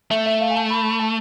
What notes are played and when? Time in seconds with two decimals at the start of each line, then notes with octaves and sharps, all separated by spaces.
0.11 A3 E5
0.26 E5
0.41 F5
0.50 G#5
0.56 A5
0.70 B5
1.00 A5